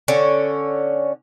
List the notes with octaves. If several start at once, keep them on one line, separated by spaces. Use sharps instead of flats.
D3 C#4